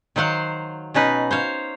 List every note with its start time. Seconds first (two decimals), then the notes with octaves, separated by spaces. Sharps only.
0.16 D#3 F#3 C5 F5 F#5
0.94 B2 C#4 D#4 B4
1.31 C5 C#5 F5